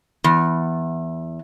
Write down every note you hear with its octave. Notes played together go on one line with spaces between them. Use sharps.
E2